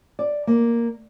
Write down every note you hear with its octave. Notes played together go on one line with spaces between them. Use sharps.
D5
A#3